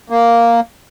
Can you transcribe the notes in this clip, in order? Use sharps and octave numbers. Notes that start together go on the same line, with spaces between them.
A#3